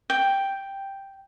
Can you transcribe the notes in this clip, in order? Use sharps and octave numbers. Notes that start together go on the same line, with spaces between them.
G5